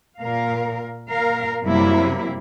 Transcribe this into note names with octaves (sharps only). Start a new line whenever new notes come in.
A#2 A#4 F5
A#2 A#4 F5
F#2 C3 F#3 G3 A#3 E4